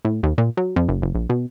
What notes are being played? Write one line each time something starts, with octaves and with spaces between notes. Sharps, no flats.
A2
D#2
A#2
F#3
F2
F#1
F#1
A#1
B2